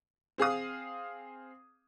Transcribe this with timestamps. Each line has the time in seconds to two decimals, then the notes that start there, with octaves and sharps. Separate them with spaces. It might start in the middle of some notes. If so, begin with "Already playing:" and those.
0.38 C4 G#4 F5 D#6